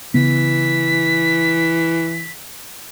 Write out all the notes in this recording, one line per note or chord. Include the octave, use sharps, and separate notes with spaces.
C#3 E3 B3 B6